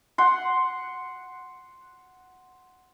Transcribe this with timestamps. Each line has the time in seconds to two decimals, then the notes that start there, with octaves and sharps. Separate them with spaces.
0.18 F#5 C6